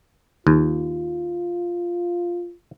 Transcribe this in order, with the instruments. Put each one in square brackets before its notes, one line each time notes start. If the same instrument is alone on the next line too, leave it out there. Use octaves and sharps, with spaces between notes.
[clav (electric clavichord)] D#2 [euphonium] F4